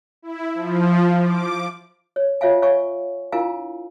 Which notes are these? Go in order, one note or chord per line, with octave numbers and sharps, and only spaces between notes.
E4
F3
D6
C#5
F4 C#5 E5 F5 G#5
C#5 F5 G#5 C#6
D4 E4 F4 A#4 F5 G#5